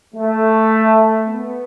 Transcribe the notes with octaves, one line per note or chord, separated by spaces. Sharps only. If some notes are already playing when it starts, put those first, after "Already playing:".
A3
B3